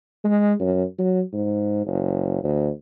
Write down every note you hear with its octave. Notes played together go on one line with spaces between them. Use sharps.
G#3
F#2
F#3
G#2
F#1
D2